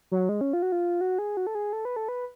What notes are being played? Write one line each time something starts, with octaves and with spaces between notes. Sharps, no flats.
F#3
G#3
C#4
F4
F#4
F4
F#4
G#4
F#4
A4
G#4
A4
B4
A4
B4